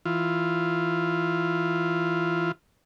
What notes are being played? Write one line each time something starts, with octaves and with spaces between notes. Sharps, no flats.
E3 F4